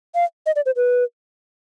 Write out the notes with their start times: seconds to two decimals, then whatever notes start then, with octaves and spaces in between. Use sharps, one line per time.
0.15 F5
0.46 D#5
0.56 D5
0.66 C5
0.76 B4